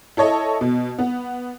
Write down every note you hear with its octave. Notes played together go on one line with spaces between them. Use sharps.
E4 A4 C#5 D#5
B2
B3